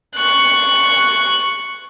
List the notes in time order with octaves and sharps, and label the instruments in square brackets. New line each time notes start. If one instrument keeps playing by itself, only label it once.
[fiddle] C#6 F#6